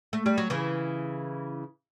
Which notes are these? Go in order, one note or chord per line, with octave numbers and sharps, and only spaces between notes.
A3
G3
F#3
C#3 E3